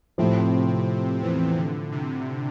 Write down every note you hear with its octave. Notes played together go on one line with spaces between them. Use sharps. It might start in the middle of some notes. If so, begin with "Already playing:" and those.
A2 C3 F3 A3 C4
E2 E3
D3
C3